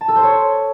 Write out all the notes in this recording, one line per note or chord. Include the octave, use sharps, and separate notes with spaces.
A5
A4
C5
C#5